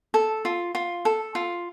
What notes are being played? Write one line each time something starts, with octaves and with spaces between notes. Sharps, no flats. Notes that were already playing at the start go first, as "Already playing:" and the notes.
A4
F4
F4
A4
F4